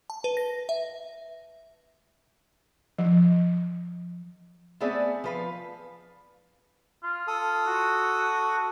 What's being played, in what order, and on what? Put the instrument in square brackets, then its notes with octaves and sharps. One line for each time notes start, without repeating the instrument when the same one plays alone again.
[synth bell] A5
B4
A#6
E5
[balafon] F3
[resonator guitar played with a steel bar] A3 B3 C4 G#4 D5 E5
F3 B4 F5
[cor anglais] F4
[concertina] A4 D#6
[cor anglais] F#4